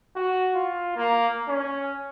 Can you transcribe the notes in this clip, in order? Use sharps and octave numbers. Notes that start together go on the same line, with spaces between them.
F#4
F4
A#3
C#4